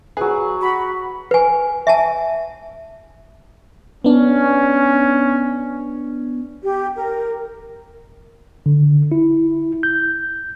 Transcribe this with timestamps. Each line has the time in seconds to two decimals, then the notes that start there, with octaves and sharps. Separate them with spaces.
0.17 F#3 G#4 B4
0.61 F#4 B5
1.31 B4 G#5
1.87 E5 G#5 A5
4.04 B3 C#4 D4
6.64 G4
6.96 A#4
8.66 D3
9.12 E4
9.83 G6